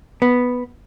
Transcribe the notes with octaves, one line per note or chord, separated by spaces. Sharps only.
B3